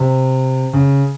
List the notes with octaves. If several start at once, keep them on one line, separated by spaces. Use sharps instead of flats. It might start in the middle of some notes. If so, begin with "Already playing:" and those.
Already playing: C3
C#3